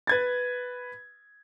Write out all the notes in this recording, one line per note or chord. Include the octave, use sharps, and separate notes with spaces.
B4 G#6 A6